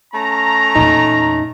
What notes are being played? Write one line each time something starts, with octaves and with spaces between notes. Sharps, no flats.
A3 C#4 A#5
E2 A#2 D#4